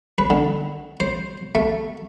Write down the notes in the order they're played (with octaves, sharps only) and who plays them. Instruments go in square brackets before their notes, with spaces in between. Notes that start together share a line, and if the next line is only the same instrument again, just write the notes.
[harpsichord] B4
D3
C5
A3